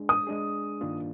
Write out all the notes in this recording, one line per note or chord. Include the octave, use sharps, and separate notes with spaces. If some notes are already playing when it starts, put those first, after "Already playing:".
Already playing: G#3 D4 G#4
D#6
G#3 D4 G#4
G2 D#3 A#3 D4 F4